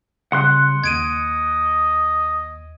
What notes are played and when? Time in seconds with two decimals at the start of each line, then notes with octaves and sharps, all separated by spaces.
0.32 C#3 G3 F#5 C6 F#6
0.84 D#2 D#5 G#6 D7 D#7